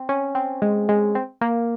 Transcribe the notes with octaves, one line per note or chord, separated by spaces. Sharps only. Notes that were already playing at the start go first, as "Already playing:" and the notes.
Already playing: C4
C#4
C4
G#3
G#3
C4
A#3